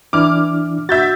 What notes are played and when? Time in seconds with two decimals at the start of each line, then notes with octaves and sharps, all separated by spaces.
0.13 E3 D4 E4 D6 F6
0.89 F#4 E5 G6 A6